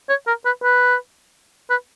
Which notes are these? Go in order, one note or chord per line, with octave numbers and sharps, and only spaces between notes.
C#5
A#4
B4
B4
B4